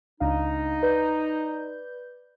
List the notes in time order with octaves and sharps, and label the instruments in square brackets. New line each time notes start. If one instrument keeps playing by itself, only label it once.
[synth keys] C#2 D4 F5 [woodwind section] D#4
[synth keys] B4 D5 G6